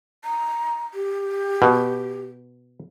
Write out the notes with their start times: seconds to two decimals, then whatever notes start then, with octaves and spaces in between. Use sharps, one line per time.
0.24 A#5
0.94 G4
1.62 B2